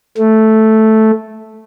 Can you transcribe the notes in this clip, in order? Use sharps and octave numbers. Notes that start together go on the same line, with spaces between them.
A3